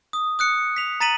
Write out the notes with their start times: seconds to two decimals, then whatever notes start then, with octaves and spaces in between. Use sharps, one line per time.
0.13 D#6
0.39 D#6 F#6 C#7
0.76 B6 F7
1.00 A#5 A6 B6 D#7 E7 F#7